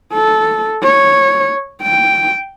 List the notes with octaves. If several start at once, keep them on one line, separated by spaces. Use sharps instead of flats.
A4
C#5
G5